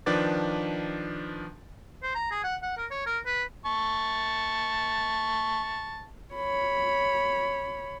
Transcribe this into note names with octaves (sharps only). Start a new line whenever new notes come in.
D#3 F3 D4 B4 D6 A6
C5
A#5
G#4
F#5
F#5
A#4
C#5
A#4
B4
A5 C#6
C#5 B5